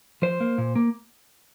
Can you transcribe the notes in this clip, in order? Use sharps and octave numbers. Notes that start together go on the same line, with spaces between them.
F3 C5
A#3
A#2
A#3